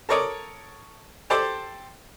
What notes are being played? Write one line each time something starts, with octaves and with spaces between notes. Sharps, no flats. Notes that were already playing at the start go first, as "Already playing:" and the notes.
A4 A#4 C#5 D5 D#6
G4 A4 C5 D5 A5 C6